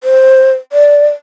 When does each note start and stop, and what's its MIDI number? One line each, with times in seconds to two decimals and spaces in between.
0.04 0.52 72
0.72 1.07 74